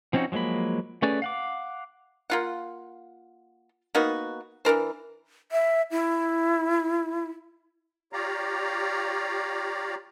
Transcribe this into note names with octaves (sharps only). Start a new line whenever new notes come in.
F3 C4 C#4 D#4 F#4
F3 F#3 G#3 A#3 B5
A3 C#4 G#4 B4 D5
F5 F#5 D6
A#3 F4 F#5
A#3 B3 D#4 F#4
E3 D4 A#4 C5
E5
E4
F4 G4 C#5 D5 F5 A#5